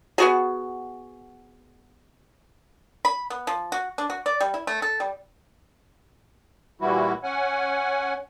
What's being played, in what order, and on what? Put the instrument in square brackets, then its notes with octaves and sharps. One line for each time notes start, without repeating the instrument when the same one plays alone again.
[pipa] B3 F#4 G#4
B5
B3
F3
F#4
D4
F#4
D5
G3
E4
A3
A4
G3
[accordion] A#2 E3 G3 E4 F#4
C#4 F#5 G#5